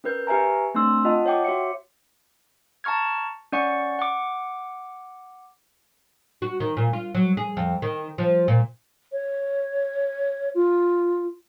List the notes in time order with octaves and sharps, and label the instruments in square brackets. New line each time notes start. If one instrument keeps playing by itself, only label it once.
[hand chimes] C#4 A#4 B4 G6
G4 B4 E5 G#5 A#5
A3 C4 D4 C6 E6
F4 D#5 F#5 A5
C#5 F#5 G5 D6
F#4 C#5 E5 C#7
[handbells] A5 A#5 C#6 F6 G#6
C#4 D5 F#5 C#6
F#5 D6
[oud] F#4
D#3
A#2
F4
F#3
G#4
F2
D#3
F3
A#2
[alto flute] C#5
F4